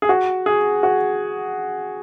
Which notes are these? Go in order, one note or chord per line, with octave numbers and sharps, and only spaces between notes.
G#4
F#4
G#4
F#4